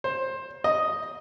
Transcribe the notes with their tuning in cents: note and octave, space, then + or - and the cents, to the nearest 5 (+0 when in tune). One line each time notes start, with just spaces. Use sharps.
C5 +15
D#5 +0